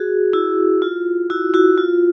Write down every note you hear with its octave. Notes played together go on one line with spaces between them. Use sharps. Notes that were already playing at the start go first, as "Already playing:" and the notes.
Already playing: F#4 G#4
E4 F#4
F4
E4 F#4
E4 F#4
F4